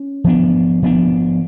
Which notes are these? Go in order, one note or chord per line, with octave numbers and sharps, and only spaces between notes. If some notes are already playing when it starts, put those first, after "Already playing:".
Already playing: C#4
F3 B3 D4
F3 B3 D4